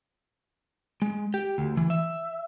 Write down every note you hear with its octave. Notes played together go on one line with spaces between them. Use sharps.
G#3
G4
D2
E3
E5